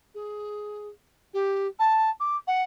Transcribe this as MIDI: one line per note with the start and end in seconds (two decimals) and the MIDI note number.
0.15 0.88 68
1.34 1.68 67
1.79 2.10 81
2.20 2.37 86
2.47 2.63 78